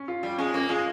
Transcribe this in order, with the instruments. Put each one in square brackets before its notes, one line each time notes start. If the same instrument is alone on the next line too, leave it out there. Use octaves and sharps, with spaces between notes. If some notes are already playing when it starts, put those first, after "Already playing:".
Already playing: [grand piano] C#4
F4
[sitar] G3 [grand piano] F4
[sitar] G#3 [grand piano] C#4
[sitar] A#3 [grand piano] C#4
[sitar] G#3 [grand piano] F4